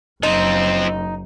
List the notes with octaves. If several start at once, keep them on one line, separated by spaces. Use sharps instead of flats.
F#1 F3 C4 D#4